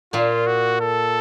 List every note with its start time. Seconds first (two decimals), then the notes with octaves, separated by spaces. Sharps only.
0.13 A#2 A#3 F4
0.46 F#4
0.81 A4